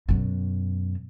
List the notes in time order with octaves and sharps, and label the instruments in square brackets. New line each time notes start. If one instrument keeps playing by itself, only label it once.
[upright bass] F#2 B2